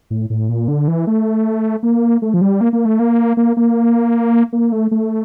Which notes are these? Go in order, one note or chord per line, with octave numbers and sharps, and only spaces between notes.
A2
A2
A#2
D3
E3
A3
A#3
A3
F3
G3
A#3
A#3
A3
A#3
A#3
A#3
A#3
A3
A3